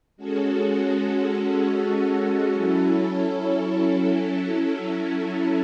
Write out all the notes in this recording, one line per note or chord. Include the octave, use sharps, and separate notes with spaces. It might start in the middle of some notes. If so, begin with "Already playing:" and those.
G#3 C#4 F#4 A4
F#3 C#4 E4 A4